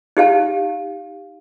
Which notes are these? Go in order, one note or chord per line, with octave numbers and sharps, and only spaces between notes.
D#4 G4 F5 A5